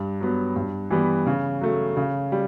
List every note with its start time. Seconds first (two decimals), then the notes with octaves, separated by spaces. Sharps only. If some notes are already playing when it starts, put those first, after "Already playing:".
Already playing: G2
0.21 F#3 B3
0.56 G2
0.91 E3 G3 B3
1.27 C#3
1.61 F#3 A3
1.97 C#3
2.32 G3